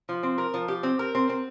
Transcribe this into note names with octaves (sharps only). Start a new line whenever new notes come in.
F3
C4
A#4
F3
G4
C4
A#4
C4
C4